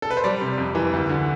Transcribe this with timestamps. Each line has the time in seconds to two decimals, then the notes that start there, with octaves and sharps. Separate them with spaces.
0.02 A4
0.11 B4
0.17 C5
0.24 G3 D5
0.41 C3
0.58 F2
0.75 E3
0.93 D2
1.09 D3